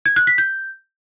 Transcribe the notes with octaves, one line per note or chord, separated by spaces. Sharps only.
G#6
F#6
B6
G6